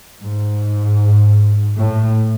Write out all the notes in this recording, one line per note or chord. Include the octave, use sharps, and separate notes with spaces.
G#2
A2